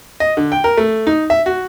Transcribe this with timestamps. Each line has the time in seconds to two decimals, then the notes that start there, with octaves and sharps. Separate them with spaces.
0.20 D#5
0.37 D3
0.52 G5
0.64 A#4
0.77 A3
1.07 D#4
1.30 E5
1.46 F#4